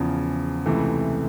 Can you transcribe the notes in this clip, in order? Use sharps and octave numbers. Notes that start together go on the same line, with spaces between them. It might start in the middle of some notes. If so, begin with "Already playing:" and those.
Already playing: E2 C#3 F3
C#2 C3 E3 A3